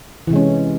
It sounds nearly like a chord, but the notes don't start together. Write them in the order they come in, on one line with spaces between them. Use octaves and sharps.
E3 C3 G#3 C#4